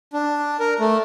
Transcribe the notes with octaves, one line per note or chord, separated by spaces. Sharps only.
D4
A#4
A3